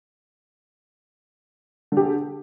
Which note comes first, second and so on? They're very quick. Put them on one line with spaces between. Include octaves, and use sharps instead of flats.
D3 G4 G#4